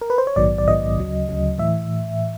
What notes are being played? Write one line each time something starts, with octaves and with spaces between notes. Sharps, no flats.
A#4
B4
C5
C#5
A#1 G#2 D#3 F#3 B3 D5
D5
A#1 G#2 D#3 F#3 B3 D#5
D2 C#3 F#3
D2 C#3 F#3
A2 E3 E5